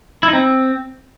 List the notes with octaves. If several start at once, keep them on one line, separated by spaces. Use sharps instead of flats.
E4
D#4
C4